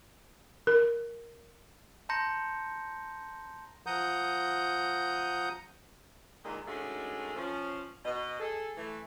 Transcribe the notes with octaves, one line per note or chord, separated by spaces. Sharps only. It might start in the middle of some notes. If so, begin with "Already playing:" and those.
A#4
A5 A#5 C6 G6 A#6 C#7
F3 F#5 A#5 D#6 G6
D#2 A#2 D3 D#3 G#3
D#3 G#3 A3 C#4 D4 F#4
F3 C#4
B2 D#5
G#4 A4
E3 A3